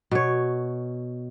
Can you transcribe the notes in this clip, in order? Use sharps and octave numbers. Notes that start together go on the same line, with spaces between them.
B2 C#5